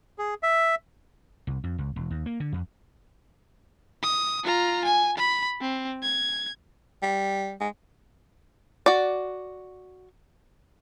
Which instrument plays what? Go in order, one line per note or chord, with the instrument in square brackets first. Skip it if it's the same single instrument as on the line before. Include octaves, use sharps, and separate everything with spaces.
[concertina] G#4
E5
[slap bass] C2
F2
C#2
E1
D#2
A#3
D3
F2
[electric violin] D#6
F4 A#5
G#5
B5
C4
G#6
[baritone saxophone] G3
G#3
[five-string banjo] F#4 D5